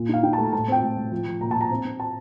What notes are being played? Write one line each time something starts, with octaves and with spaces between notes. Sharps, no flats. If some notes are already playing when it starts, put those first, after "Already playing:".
Already playing: A#2
D#4 F5
D#4 G5
A3 A5
A#5
A2 A5
C4 G5
A2
A2
F3
F3
A#2 A#5
A#2 A5
A#5
C4
C4
A5